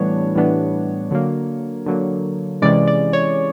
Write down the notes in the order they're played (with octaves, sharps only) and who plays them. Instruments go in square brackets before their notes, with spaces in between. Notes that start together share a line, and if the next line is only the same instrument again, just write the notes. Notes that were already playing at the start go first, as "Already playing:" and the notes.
Already playing: [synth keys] A2 E3 G3 B3 D4 C#5
A2 E3 G3 B3 D4
D3 F#3 A#3
D3 F#3 A#3
C3 E3 G#3 C#4 D5
D5
C#5